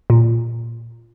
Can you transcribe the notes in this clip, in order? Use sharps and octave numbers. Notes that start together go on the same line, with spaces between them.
A#2